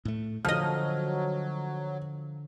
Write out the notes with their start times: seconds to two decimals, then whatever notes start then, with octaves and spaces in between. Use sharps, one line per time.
0.05 A2 A3
0.45 D3 F3 F#3 D#5 F6